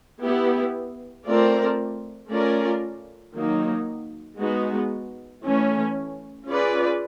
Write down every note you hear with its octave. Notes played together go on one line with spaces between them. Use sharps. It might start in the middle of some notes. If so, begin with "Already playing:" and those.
B3 E4 G4
A3 C4 F4 A#4 D5
A3 C#4 F4 A#4 D5
D#3 F#3 A#3 D#4
G#3 B3 D#4 F#4
E3 A3 C#4
C#4 F4 G#4 B4 D5